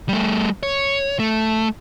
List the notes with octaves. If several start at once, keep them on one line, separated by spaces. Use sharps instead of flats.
G3 A3
C#5
A3